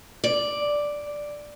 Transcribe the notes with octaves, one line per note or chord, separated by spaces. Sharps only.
D5